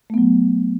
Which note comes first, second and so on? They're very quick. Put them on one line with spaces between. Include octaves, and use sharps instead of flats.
A3 B3 F#3